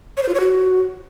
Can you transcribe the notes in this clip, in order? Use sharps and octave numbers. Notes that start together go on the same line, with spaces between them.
C#5
C5
F4
C#5
F#4